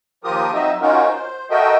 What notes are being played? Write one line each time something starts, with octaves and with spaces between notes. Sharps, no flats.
D#2 F3 F4 G4 A#4 D#6
F#3 C4 D#4 D#5 E5
C#4 D#4 F4 F#4 A#4
C5
F#4 A4 A#4 D#5 E5 G5